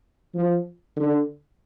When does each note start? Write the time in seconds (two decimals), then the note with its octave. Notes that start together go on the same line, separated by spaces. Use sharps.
0.34 F3
0.97 D3